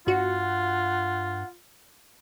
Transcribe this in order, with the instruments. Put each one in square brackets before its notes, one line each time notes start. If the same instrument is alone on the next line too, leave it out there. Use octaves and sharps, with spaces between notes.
[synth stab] G1 F#4 [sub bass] G2 [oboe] F4 [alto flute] F#5